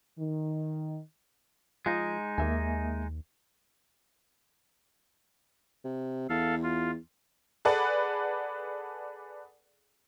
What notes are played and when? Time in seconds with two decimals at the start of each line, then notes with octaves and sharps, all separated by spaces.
0.18 D#3
1.86 F3 G#3 D#4
2.38 D#2 A#3 E5 G#5
5.84 C3
6.29 E2 A4 F5
6.63 F4
7.65 G#4 A4 B4 D5 F#5